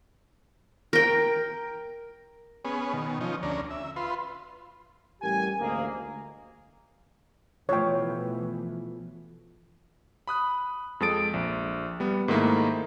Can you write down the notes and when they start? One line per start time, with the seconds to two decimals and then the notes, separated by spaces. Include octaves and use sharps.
0.93 A#4 G5
2.65 B3 C#4 G#4
2.93 B2 D#3
3.21 F3 C#4 D#4
3.43 D2 C#4 D4 A#5
3.71 E5
3.96 F4 B4 C6
5.22 A1 G3 G4 A#4 G#5
5.60 D2 G#2 A#3 G#4
7.69 B2 E3 F3 A3 F4 C#5 G5
10.27 B5 D#6 F#6
11.00 F2 G#3 A4 D#6 A6 D7
11.34 A#1
12.00 G3 B3
12.28 G#2 D#3 A3 A#3 D#4 E4